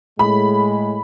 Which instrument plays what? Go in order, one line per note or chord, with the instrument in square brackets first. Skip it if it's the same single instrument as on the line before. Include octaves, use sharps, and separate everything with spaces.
[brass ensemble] A2 G#3 [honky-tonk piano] B5